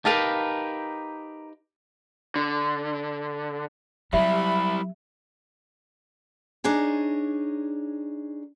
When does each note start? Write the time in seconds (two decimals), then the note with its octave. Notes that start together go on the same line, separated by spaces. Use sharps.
0.05 D#4 G4 A#4 B4 F5 A5
2.36 D3
4.13 F#3 G3 C4 E4 G4 E5 B5
6.64 D4 D#4 G#4 C#5